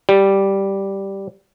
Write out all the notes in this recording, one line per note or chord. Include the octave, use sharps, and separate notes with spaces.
G3